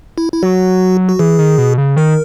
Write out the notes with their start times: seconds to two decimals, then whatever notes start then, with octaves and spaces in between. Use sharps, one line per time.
0.18 E4
0.32 E4
0.42 F#3 F#4
1.09 F#4
1.19 E3 G#4
1.39 D#3
1.58 B2
1.78 C#3
1.96 D#3 A#4